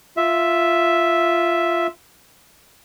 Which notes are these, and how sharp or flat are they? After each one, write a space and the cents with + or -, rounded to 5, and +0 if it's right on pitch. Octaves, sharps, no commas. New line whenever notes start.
F4 -10 E5 +0